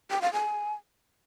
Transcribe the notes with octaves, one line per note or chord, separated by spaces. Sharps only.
G5
F5
G#5